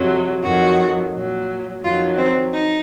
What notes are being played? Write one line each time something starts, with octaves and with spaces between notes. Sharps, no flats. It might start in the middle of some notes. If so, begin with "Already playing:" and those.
Already playing: F2 C3 F#3
F2 D#3 F#3 F#4
A#2 F#3
F2 D#3 F#3 F4
C4
D#4